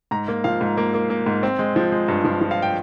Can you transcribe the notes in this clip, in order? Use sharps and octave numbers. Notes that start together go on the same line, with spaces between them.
G#2 A#5
A#3
F3 F5
G#2
A#3
A#3
A#3
G#2
C4
G#3
F3
G#3
G2
F3
F3
F5
G5